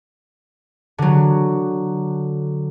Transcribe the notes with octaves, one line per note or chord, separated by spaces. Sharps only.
D3 F#3